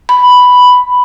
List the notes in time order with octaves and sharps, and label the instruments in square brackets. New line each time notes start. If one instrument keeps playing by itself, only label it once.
[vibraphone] B5